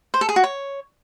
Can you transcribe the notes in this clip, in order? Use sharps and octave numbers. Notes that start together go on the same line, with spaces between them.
C5
A4
G#4
F#4
C#5